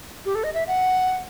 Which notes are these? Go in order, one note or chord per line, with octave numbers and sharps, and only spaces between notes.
G4
A4
D#5
E5
F#5